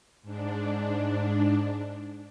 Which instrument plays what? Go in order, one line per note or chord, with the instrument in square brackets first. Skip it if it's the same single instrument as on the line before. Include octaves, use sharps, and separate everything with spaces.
[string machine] G#2 D4